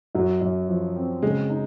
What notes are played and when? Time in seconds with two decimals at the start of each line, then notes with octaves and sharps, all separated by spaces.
0.15 F#2 F#3
0.41 F#2
0.69 F3
0.96 C4
1.22 C#3 G#3
1.49 D#4